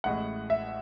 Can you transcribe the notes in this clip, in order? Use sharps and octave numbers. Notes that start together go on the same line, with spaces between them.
A1 A2 G#3 F#5
E5